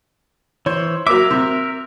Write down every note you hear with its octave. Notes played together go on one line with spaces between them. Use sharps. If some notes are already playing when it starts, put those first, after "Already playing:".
E3 C5 C#5
F#3 A#3 A#4 E5 D6
C3